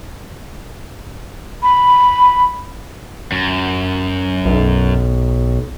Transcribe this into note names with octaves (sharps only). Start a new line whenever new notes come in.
B5
F#2
B1